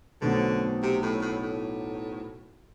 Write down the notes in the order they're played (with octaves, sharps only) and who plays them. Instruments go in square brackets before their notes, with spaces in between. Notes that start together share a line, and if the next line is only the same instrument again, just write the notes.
[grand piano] B1 B2 A3 C4 [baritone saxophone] D3
[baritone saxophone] C3
A2
A2
A2